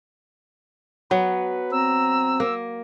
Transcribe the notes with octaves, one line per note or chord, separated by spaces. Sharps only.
F#3 B3 B4
C4 A#5 E6
A#3